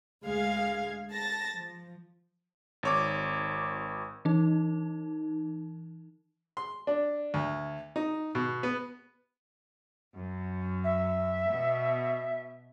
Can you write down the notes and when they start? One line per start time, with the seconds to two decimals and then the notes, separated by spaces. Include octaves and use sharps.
0.24 D2 G#3 F5 G#6
1.11 A5 A6 A#6
1.56 F3
2.83 G#1 C#5 D6
4.25 E3 D#4
6.57 C6
6.87 D4
7.34 D2
7.96 D#4
8.35 B2
8.63 B3
10.14 F#2
10.84 E5
11.48 B2